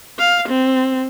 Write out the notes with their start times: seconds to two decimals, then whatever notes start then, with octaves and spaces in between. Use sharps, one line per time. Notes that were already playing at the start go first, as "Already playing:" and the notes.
0.19 F5
0.48 C4